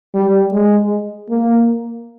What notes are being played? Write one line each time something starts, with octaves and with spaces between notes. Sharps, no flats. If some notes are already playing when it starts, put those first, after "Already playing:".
G3
G#3
A#3